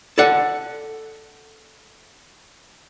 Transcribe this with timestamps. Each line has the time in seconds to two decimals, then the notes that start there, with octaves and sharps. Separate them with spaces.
0.18 A4 D5 F#5